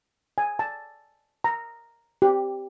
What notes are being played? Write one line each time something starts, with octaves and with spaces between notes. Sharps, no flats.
G#5
A5
A#5
G4